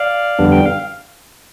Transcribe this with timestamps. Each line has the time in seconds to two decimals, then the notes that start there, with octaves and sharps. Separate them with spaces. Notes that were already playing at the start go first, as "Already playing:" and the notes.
Already playing: D5 F5
0.39 F2 D3 G3 B3 D4
0.52 G5
0.66 F5